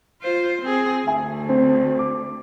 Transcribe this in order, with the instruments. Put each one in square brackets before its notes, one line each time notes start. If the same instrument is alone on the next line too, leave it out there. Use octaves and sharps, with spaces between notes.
[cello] F4 C5
C4 G#4
[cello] D2 [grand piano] E5 G#5
[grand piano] C4
D6